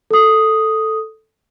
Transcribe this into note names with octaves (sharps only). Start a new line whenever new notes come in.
A4 D#6